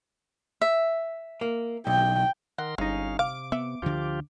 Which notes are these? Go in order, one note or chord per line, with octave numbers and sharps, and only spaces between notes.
E5
A#3
B1 G5
D#3 A#4 F#5 C6
G1 G#3 C#4 D#4 F5
C3 F5 D6
B3 E5
D2 D3 F3 F4 G4